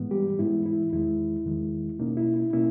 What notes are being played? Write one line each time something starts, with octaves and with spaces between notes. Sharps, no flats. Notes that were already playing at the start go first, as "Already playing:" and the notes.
Already playing: G#2 E3 G#3 B3
G3 G4
G#2 E3 G#3 B3 E4
E4
E2 D#3 G#3 E4
E2 D#3 G#3
B2 A#3 C#4 D#4
E4
E4
B2 A#3 C#4 E4